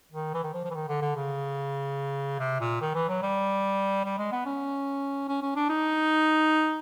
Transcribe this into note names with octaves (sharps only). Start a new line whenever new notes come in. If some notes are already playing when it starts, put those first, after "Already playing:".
D#3
E3
D#3
F3
F3
E3
D#3
D3
D3
C#3
C3
A#2
D#3
E3
F#3
G3
G3
G#3
B3
C#4
C#4
C#4
D4
D#4